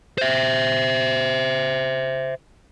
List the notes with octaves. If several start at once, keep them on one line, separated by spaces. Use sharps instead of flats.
C5 E5